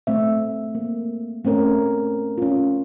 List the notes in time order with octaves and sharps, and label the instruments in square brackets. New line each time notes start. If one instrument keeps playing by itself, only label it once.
[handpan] A3 C4 E5
A#3
A3 C4 C#4 A#4 C#5
C#4 F4